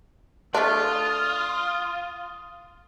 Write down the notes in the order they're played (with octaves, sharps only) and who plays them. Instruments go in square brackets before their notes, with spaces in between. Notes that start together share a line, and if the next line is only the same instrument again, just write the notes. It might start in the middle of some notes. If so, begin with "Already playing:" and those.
[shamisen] A3 D4 [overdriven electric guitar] F4 [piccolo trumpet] D#6